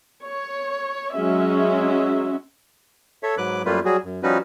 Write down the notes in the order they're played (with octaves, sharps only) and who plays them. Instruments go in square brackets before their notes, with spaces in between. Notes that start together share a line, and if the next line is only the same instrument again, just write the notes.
[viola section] C#5
F#3 G#3 C#4 E5
[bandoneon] A4 C#5 E5
G#2 F#3 B4 D6 F#6
F#2 G3 A3 A#3 F4 B4
F#3 G3 F#4 G#4
F#2
F3 G3 C#4 D#4 F#4 B4